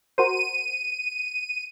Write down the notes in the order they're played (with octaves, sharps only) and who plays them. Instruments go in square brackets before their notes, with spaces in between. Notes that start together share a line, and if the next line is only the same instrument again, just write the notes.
[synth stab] F#4 A#4 C5 [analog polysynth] D#7